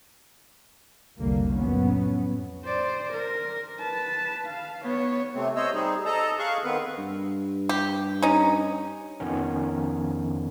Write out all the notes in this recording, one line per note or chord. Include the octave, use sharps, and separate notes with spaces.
F1 C2 D3 G3 A#3
F2 A2 F#3 B3 C#4
C5 D5
A#4
B4 A5
F5
B3 C#5
C3 A3 C4
C5 C#5 D#5 E6
G3 C4 D#4 G#4
A4 D#5 A5 A#5
G#4 F5 C#6 F#6
D#3 B3 C4 B4
G2
G4
C#4 D#4
F2 D#3 B3 C#4